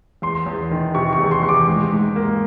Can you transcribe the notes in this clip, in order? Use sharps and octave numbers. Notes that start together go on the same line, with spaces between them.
E2 C6
E2
D#3
C3 C#6
C#6
E2
C6
E2
D6
G#2
G#2
A#3